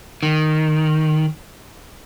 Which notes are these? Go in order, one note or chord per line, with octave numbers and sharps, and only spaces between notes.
D#3